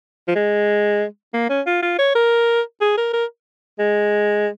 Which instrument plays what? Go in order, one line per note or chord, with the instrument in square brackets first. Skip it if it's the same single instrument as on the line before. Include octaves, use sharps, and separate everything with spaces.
[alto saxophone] F3
G#3
A#3
C#4
F4
F4
C#5
A#4
G#4
A#4
A#4
G#3